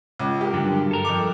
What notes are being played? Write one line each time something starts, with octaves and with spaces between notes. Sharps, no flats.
C#2
G4 A#4
G2 D3 F#3
A4 A#4
F2 D6